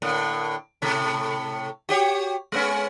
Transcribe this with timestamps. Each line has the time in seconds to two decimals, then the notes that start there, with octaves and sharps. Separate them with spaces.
0.02 A2 D3 A#3
0.82 A2 C3 A3
1.89 F#4 G4 C#5
2.52 G#3 B3 C#4